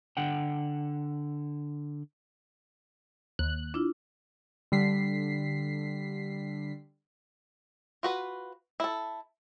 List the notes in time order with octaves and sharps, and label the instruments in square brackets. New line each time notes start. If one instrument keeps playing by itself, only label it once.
[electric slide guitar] D3 F#5 G5
[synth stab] D#2 F#6
[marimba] D4 E4 F4
[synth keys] D3 G3 B6 C7
[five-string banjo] F4 F#4 B4
E4 A4